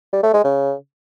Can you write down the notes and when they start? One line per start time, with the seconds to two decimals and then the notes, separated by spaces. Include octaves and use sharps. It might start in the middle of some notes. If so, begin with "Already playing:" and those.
0.13 G3
0.23 A3
0.34 G#3
0.44 C#3